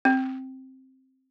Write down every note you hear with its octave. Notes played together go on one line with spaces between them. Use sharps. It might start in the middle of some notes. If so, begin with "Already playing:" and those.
C4